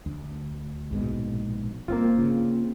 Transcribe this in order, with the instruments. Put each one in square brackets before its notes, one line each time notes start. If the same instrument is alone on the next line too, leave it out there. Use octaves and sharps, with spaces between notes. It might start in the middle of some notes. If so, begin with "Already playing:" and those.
[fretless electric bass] D2
A#1 G#2 B2
[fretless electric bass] G1 [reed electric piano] A#3 C4 F4
[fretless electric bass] C#3